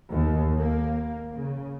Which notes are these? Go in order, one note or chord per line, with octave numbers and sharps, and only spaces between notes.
D#2
A#3
C#3